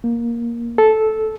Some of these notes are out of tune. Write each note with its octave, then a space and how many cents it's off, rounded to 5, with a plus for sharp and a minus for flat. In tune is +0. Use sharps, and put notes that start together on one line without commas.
A#3 +10
A4 -10